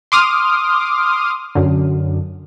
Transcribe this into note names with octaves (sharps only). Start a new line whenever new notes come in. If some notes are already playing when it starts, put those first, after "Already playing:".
C6 D6 D#6 F6
F#2 D3